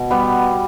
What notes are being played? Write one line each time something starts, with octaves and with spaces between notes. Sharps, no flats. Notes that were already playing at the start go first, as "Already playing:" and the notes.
Already playing: B2
G3 B3